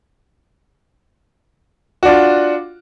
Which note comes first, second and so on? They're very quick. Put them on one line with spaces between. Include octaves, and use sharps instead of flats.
F#4 D4 F4